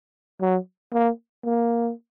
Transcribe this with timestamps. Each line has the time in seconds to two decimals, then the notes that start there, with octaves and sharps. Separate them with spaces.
0.41 F#3
0.93 A#3
1.45 A#3